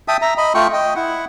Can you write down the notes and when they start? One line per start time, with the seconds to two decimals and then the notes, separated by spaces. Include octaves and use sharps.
0.08 E5 G5 A5 D#6
0.22 E5 A#5
0.38 D#5 B5
0.55 A3 F4 G5 C#6
0.73 D#5 G5
0.96 E4 F#5